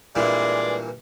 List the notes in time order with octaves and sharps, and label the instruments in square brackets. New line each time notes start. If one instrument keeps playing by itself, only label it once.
[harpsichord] G2 A#2 E3 [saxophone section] G#3 D5